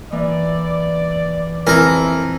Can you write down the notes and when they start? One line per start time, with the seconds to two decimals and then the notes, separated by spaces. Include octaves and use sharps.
0.12 E3 A#3 D5
1.67 F2 E3 G#4 A#4 E6